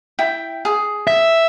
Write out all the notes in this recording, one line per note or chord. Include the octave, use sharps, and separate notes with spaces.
E4 G5
G#4
E5